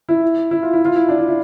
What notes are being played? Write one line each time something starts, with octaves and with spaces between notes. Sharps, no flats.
E4
E4
F4
E4
F4
E4
D4
E4
E4